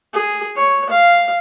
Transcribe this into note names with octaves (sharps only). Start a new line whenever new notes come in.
G#4
C#5
F5